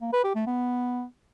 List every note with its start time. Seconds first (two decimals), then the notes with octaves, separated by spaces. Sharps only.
0.02 A#3
0.13 B4
0.24 G4
0.35 A3
0.47 B3